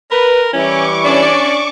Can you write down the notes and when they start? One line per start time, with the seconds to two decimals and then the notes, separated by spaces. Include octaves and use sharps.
0.11 A#4 B4
0.53 E3 G3 C#4 E4 C#6 D6
1.04 C#4 D4 D5